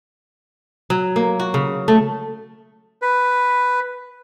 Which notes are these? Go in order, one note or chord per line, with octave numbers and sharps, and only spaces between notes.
F#3
A#3
F#4
C#3
A3
B4